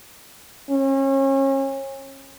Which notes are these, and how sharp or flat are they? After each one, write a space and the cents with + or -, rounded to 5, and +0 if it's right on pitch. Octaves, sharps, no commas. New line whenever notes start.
C#4 -35